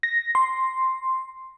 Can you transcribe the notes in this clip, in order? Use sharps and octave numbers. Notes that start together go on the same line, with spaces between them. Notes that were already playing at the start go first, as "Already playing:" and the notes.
A#6
C6